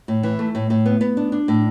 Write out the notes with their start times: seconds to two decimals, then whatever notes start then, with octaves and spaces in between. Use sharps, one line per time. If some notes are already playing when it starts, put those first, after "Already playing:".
0.08 A2
0.23 E3
0.39 A3
0.55 A2
0.70 A2
0.86 B3
1.01 B3
1.17 D4
1.32 D4
1.48 A2